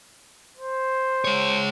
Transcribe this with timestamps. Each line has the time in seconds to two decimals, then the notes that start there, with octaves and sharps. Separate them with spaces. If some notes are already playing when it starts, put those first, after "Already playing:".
0.57 C5
1.25 G#3 C#5